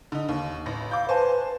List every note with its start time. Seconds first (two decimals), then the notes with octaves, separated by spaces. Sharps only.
0.12 D3 D#4
0.29 D#2
0.66 A1 A#6
0.91 F5 D6 G6
1.09 B4 C5 G#5 A5